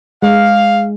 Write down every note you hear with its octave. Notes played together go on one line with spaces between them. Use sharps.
G#3 F5